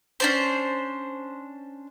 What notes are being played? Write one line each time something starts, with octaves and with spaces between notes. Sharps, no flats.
C#4 D4 C5